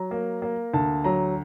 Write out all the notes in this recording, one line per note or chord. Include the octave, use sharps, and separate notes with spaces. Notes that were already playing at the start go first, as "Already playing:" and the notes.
Already playing: F#3 A#5
A#3
A#3
D2 A5
F#3 A#5